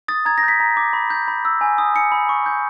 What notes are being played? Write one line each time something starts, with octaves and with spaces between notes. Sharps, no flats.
D#6 A6
A#5 G#6
A#6
G6
B6
A#5
D6
B5
G6
B5
E6
G#5
D#6
G#5 C#7
B5
C#6
G6